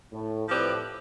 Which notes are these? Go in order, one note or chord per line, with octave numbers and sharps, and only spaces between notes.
A2
A2 F3 C4 G4 B4 D5